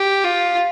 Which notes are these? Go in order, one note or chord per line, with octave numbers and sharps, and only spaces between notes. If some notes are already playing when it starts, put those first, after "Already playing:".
Already playing: G4
F4